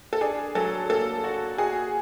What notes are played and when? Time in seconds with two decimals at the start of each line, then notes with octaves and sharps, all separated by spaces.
0.13 A4
0.21 D4 G#4
0.55 F#3 A4
0.90 A#3 A4
1.24 F#4
1.58 F#4 G#4